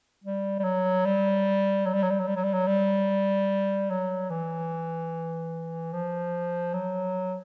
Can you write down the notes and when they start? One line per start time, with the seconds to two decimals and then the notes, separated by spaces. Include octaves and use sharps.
0.24 G3
0.59 G3
0.64 F#3
1.05 G3
1.86 F#3
1.94 G3
2.03 F#3
2.11 G3
2.19 F#3
2.27 G3
2.36 F#3
2.44 G3
2.53 F#3
2.67 G3
3.90 F#3
4.30 E3
5.93 F3
6.74 F#3